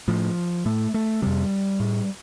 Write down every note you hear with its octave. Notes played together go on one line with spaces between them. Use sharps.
A2 F3
A2 A3
A3
F2 C3 G3
A2